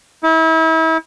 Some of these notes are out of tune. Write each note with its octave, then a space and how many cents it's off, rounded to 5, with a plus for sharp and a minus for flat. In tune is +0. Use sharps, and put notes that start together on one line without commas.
E4 -35